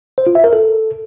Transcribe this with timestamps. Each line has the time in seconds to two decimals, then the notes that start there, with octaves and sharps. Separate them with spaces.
0.18 C5
0.27 F4
0.35 E5
0.44 A#4
0.53 A4